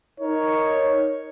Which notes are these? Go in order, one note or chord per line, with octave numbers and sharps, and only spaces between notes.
D#4 A#4 C#5